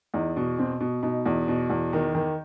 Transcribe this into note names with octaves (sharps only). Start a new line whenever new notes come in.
E2 D#4
B2
B2 C4
B2
B2 D#4
E2
B2
E2
D#3
D#3